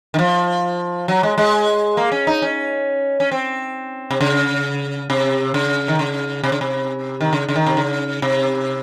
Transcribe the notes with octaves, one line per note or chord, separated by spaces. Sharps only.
D#3
F3
F#3
G#3
G#3
A#3
C#4
D#4
C#4
C#4
C4
C3
C#3
C3
C#3
D#3
C#3
C3
C#3
C3
D#3
C#3
C#3
D#3
C3
C#3
C3